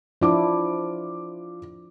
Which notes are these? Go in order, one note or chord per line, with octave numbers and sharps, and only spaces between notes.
F3 D4 E4 F4 D6